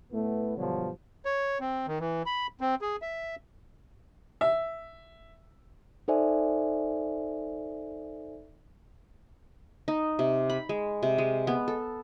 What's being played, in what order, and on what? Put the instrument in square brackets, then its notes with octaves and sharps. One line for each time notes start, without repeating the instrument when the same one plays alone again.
[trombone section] A2 A3 B3
G2 B2 D3 F3 F#3
[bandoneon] C#5
C4
D#3
E3
B5
C4
G#4
E5
[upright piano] E5
[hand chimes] D#4 A4 C5 D5 E5 G#5
[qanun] D#4
C3
B5
G#3
C3
G#3
B3
A4